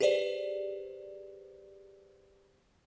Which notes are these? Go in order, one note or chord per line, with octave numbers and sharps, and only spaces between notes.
G4 G#4 B4 C5 D5